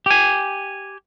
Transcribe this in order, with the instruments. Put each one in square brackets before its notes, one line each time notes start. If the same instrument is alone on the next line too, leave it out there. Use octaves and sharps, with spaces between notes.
[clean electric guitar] G4 G#5